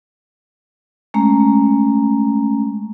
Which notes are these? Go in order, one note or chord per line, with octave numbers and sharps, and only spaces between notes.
G#3 A3 C#4 A#5